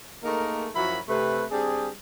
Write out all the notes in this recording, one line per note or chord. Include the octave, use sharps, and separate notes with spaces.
A3 A#3 D#4 G#4 A#4
F#2 F3 E4 F#4 A#4 B5
C3 A3 B4
G3 C4 D4 G#4